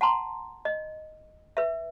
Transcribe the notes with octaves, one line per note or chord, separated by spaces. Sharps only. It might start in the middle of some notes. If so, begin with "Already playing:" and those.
F#5 A5 A#5 C6
D#5
B4 E5